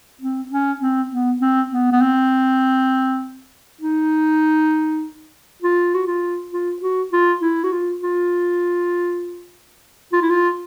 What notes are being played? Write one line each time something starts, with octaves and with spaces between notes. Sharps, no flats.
C4
C#4
C4
B3
C4
B3
B3
C4
D#4
F4
F#4
F4
F4
F#4
F4
E4
F#4
F4
F4
F4
E4
F4